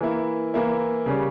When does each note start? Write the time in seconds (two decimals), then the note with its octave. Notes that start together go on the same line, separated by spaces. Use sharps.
0.01 E3 A#3 E4
0.54 E3 A#3 E4
1.06 C#3 G3 C#4